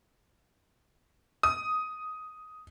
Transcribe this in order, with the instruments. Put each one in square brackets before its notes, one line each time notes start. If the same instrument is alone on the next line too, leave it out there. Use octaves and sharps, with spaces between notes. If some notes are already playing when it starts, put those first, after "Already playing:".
[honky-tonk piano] D#6